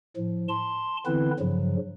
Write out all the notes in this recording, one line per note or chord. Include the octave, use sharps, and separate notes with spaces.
A2 F3
A5 C6
D3 E3 B3 C4 E4 B4
G2 C#3 F3 F#3